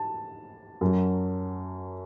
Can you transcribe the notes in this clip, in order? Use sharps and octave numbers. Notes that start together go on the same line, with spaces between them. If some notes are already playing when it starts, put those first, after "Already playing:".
Already playing: A5
F#2 F#3